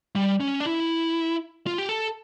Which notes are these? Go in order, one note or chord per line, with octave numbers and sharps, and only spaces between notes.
G3
C#4
D4
E4
F4
G4
A4